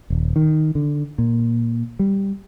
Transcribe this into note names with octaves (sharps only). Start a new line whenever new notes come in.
D#1
D#3
D3
A#2
G3